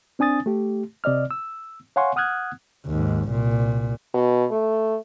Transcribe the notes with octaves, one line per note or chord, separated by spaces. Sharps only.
C4 D4 G#5 D#6 A6
A3 G4
C3 D5 D#5 F6
E6
C#5 F5 F#5 G#5 C6 C#6
F#5 D#6 F6 F#6 G#6
D#2 G#2
C2 A#2
B2
A3